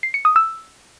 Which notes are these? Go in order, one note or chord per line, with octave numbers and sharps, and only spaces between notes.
C7
C#7
D#6
E6